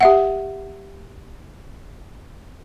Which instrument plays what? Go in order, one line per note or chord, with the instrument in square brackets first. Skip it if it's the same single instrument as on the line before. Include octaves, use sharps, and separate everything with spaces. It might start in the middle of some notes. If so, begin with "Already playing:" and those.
[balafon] G4 E5 F#5